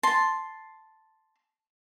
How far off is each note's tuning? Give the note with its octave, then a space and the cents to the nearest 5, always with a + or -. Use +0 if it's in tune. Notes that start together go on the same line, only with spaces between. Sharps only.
A5 +0 C6 +0